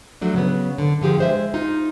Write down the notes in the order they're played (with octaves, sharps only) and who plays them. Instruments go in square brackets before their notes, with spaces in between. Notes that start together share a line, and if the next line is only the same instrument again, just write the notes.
[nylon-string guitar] F3 F#3 A3 D4
C#3 F#3 B3
D3
D3 F3 G4 G#4
G#3 C5 E5
D#4 F4